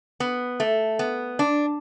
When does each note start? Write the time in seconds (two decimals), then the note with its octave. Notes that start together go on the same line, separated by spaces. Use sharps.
0.20 B3
0.60 A3
0.99 B3
1.39 D4